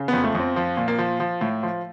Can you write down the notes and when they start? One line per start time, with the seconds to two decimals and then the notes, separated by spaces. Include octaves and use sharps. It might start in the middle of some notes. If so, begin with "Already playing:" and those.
Already playing: C#3
0.08 F2 B3
0.24 A3
0.35 F2 C4
0.56 F3
0.77 A#2
0.88 A#3
0.98 F3
1.20 F3
1.41 A2
1.63 F3